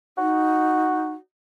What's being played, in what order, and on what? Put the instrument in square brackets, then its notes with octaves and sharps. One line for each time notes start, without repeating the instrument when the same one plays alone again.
[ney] D#4 [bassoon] F#4